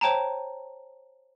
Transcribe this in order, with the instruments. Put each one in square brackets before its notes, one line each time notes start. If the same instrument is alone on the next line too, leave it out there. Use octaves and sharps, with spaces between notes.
[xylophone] C5 C#5 G5 A5 A#5